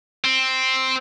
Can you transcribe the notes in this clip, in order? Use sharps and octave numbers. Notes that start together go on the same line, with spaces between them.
C4